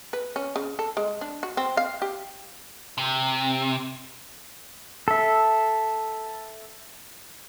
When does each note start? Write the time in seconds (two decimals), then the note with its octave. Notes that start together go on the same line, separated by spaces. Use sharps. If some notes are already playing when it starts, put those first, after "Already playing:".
0.13 B4
0.36 C#4
0.56 C#3
0.79 A4
0.97 G#3
1.21 D4
1.43 F#4
1.57 C4
1.77 F5
2.02 G4
2.98 C3
5.08 A4 E5